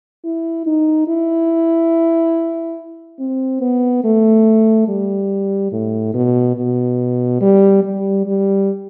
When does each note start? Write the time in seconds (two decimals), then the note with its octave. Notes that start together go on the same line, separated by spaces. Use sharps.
0.25 E4
0.66 D#4
1.08 E4
3.19 C4
3.61 B3
4.04 A3
4.88 G3
5.72 A2
6.14 B2
6.56 B2
7.41 G3
7.83 G3
8.26 G3